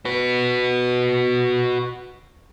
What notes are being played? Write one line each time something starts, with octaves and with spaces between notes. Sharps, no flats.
F#4 B4